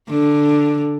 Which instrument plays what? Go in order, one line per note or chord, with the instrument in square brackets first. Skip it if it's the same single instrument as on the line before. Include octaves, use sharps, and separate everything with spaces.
[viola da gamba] D3